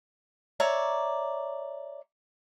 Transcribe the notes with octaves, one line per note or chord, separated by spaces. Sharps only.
C#5 D5 E5 A#5